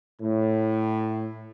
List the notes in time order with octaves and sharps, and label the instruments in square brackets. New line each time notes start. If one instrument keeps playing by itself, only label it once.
[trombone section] A2